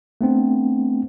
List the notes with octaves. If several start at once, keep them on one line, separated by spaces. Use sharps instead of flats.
A3 B3 C4 D4